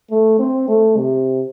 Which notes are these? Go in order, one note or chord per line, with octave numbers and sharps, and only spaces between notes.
A3
C4
A3
C3